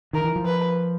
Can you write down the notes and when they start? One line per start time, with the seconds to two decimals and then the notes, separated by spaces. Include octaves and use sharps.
0.13 D#3 A#4
0.24 E3
0.36 F3
0.45 B4